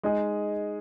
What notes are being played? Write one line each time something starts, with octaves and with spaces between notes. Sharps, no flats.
G#3 D#4 G#4